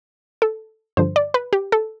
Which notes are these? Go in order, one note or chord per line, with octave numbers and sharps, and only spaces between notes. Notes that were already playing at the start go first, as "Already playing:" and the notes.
A4
G2 D3 F3 C5
D5
B4
G4
A4